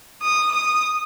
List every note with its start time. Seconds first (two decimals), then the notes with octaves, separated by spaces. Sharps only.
0.22 D#6
0.52 D#6